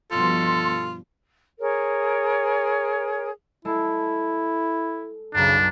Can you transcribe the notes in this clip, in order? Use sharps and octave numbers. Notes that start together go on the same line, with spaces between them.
G2 B2 F3 F4 A4 C6
G#4 A#4 C#5
G#3 E4 A4
B1 F#2 C#3 D4